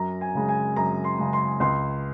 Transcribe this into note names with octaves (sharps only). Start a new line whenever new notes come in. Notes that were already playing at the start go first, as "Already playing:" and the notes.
Already playing: F#2 A#5
G#5
C#3 G#3
G#5
F#2 A#5
C6
C#3 G#3
C6
C#2 C6